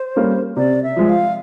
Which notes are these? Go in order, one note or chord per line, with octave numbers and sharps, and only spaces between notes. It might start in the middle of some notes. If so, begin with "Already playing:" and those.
Already playing: C5
G3 A#3 C#4
C3 D5
E5
F3 G#3
F5